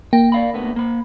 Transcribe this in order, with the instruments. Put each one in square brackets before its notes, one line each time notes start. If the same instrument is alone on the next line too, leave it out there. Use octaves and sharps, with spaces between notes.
[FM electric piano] A#3 [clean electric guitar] G5
[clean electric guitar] D5 F5 B5
D2 A3 B3
A#3 B5